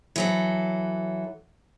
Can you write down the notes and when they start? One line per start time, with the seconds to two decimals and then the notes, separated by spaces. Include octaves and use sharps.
0.16 E3 F#3 A4